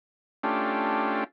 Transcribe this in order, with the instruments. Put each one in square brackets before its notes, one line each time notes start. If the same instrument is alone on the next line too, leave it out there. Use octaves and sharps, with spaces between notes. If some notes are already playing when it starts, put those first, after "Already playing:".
[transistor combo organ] A3 C#4 D4 F4 G4